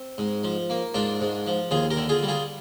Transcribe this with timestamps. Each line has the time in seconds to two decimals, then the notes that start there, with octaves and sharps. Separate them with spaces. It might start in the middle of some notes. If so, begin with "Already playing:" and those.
Already playing: C4
0.18 G#2
0.44 F3
0.70 A#3
0.94 G#2 D4 F4
1.21 G#2
1.47 F3
1.71 D#2 F4 G#4
1.90 G4 A#4
1.97 D3
2.09 F4 G#4
2.23 G3
2.28 F4 G#4